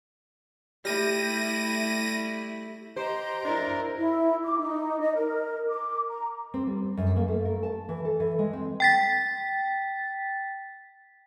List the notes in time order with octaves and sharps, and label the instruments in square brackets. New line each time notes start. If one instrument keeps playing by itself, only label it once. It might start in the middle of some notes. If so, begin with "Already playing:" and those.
[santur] G3 G4 [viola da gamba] A3 E4 [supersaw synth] A#6 D#7
[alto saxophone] G4 [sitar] C5 [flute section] D#5 A#5 C6
[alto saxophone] D4 [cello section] E4 A#4
[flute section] E4
D6
D#4
D#5
A#4
D6
A#5
[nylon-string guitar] C4
G3
F#2
A#3
A3
A#4
A5
E3
A4
E3
G#3
C4
[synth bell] G5 A6 B6